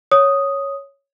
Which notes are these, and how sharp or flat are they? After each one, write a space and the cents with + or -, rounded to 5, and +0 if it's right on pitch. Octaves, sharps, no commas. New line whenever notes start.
C#5 +0 D#6 +0